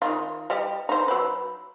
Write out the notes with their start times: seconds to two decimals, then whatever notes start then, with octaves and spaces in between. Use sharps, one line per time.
0.02 D#3 D#4 F4
0.50 G3 G4 D#5
0.89 D#4 C5
1.08 F#3 B4